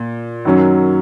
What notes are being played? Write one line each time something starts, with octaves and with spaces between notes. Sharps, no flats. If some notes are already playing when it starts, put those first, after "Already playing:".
Already playing: A#2
F#2 D#3 F#3 C#4